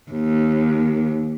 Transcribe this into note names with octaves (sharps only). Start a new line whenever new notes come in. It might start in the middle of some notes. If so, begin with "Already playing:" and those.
D#2